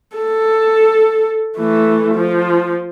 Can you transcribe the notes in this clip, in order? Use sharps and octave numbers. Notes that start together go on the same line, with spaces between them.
A4
E3 A3
F3